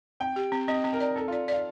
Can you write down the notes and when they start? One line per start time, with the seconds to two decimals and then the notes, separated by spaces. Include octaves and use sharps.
0.20 C4 G5
0.36 G4
0.52 C4
0.68 C4 D#5
0.84 C4
0.92 A#4
1.00 D5
1.16 C4 A4
1.28 F4 D5
1.48 D5 F5